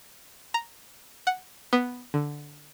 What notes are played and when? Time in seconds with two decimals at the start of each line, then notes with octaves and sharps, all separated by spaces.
0.54 A#5
1.27 F#5
1.73 B3
2.14 D3